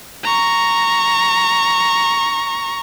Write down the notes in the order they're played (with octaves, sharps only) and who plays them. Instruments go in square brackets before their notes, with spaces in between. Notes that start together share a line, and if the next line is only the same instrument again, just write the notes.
[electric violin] A#5 C#6